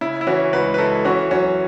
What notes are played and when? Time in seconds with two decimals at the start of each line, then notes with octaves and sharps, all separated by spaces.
0.01 C#3 E4
0.21 E4
0.27 E3 C#4 F#4
0.53 C#2 F#4 B4
0.74 B4
0.78 C#2 E4 A4
1.05 E3 C#4 F#4
1.31 F#2 C#4 F#4